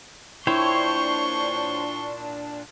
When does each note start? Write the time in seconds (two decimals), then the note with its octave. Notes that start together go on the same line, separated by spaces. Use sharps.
0.47 A#2 D4 E4 C5 C#5 G5 C6 C#6